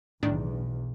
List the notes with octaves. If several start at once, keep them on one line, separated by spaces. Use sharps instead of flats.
B1 E2 A2 D#3 D4